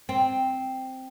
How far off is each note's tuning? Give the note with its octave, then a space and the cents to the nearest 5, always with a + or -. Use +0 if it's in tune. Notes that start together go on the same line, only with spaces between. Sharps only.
C4 +0